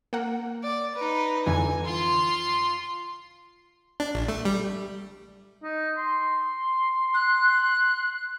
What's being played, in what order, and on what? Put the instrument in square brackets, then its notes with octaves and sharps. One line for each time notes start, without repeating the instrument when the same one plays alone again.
[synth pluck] A#3 F#5
[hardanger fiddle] D5
D#4 B4
[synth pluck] F2 D3 E3 [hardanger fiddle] G#5
[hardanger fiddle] F4 C6
[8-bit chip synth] D4
A#1
A3
G3
[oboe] D#4
C6
[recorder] F#6